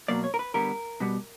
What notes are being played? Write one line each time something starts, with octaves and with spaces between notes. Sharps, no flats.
B2 F#3 A#3 D5
C#5
A#4
B4
D3 G3 B3 A#4
B2 G3 B3